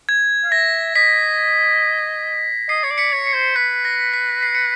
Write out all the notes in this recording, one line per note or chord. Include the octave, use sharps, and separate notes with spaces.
G#6
F5
E5 A#6
D#5 B6
D#5 C7
C#5
D5
B6 C#7
C#5
C7
C5
B4 B6
A#6
B6
C7
C#7